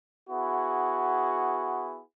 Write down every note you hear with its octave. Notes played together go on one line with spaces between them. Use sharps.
B3 E4 F#4 G#4